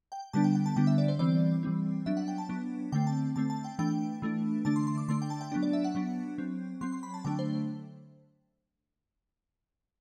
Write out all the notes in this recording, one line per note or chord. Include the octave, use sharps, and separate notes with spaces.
G5
D3 G3 B3 D4 A5
G5
G5
A5
D3 G3 B3 D4 G5
E5
D5
C5
E3 G3 C4 D5
E3 G3 C4
F#3 B3 D4 E5
F#5
G5
A5
F#3 B3 D4
D3 A3 C4 G5
A5
D3 A3 C4 A5
A5
G5
E3 A3 D4 G5
E3 A3 D4
D3 A3 D4 A5
C6
C6
D6
D3 A3 D4 C6
G5
A5
G5
F#3 B3 D4
D5
E5
F#5
F#3 B3 D4
F#3 C4
F#3 C4 C6
C6
B5
A5
D3 F#3 A3 D4 G5
C5